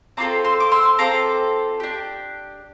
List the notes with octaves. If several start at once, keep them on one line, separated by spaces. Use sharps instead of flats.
C4 F4 A4 A#5 D6
C6 E6
D6
C6 E6
C4 F4 A4 A#5 D6
D4 G4